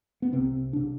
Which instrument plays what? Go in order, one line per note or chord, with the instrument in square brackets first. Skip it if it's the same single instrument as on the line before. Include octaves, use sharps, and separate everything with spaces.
[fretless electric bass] B3
C2 C3 C4
C3 D4